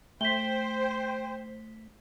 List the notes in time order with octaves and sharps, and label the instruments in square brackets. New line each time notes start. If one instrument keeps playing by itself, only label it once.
[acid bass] A3 [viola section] C5 [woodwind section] G5 [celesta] B6 G7